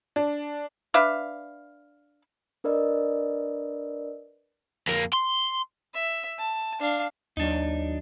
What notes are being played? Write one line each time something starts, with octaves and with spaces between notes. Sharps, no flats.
D4
D4 B4 E5 F5
D4 A#4 B4 D5 D#5
F2 A#3
C6
E5
A5
D4 F5
D#2 F#3 D4 D#4